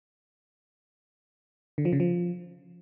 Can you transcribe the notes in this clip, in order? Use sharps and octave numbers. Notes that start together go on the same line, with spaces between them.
D3
F3
C#3
F3